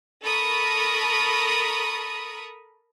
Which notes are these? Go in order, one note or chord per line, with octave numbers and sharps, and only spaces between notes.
A4 A#4 A#5 B5 C#6 D#6